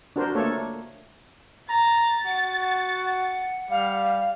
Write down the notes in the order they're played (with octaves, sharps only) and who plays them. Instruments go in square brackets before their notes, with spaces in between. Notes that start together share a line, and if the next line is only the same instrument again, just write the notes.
[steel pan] D4 F#4 A#4 C5
A3 A#3 D4 A4 C#5
[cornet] A#5 [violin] A6
[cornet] F#4 [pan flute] F#5
[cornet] G3 [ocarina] F5